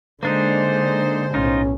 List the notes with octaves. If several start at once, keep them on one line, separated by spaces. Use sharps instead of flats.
D3 G#3 A#3 D4 D#4 C5
B1 A2 C#4 D#4 F4